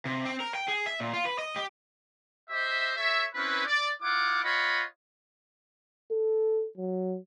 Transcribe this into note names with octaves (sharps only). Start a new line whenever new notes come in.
C3
C4
A#4
G5
G#4
E5
A#2
F4
B4
D#5
G4
G4 C5 D#5 E5
A4 C#5 E5
C4 C#4 E4 B4
D5
E4 F4 F#5 D6
F4 C#5 D#5 F#5 B5
A4
F#3